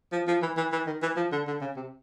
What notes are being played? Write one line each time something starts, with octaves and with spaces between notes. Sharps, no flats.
F3
F3
E3
E3
E3
D#3
E3
F3
D3
D3
C#3
C3